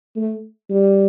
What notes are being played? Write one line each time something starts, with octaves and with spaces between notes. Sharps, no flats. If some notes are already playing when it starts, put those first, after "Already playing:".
A3
G3